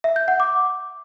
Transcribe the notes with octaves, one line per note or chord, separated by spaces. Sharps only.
E5
G6
F#5
D6